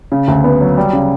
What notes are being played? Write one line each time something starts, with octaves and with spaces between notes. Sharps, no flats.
C#3
D2
B3
F#3
G3
C#3